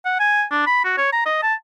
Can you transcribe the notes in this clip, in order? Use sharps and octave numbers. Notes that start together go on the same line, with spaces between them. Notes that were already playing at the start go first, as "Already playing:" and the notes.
F#5
G#5
D4
B5
F#4
C#5
A#5
D#5
A5